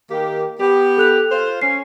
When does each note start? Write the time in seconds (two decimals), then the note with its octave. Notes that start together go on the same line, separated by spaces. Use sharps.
0.11 D#3 A#3 G4
0.60 B3 G4
0.98 A4 F#6 F7
1.31 F4 C5
1.62 C#4 C7